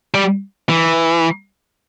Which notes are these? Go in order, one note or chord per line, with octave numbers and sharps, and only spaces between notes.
G3
E3